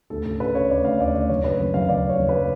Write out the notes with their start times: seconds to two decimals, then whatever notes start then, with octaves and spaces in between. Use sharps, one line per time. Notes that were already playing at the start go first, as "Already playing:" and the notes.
0.10 D2 A4
0.25 C#3 A4
0.40 C#3 B4
0.55 C#3 C#5
0.70 D2 D5
0.85 D2 F5
0.99 D2 D5
1.15 D2 D5
1.29 F#1 C#5
1.44 C#3 B4
1.60 F#1
1.74 F#1 F5
1.89 F#1 D5
2.04 C#3
2.09 C#5
2.19 F#1
2.29 B4